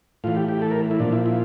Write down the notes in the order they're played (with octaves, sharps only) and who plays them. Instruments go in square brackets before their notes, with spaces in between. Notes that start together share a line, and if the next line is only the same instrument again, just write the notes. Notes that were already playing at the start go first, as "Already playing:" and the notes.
[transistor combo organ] A2 E3 F4
G4
G4
A4
A#4
E4
A#2 F3 D4
E4
E4